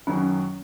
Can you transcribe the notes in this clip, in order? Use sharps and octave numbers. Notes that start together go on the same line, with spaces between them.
F#2 D#3 F#3 C#4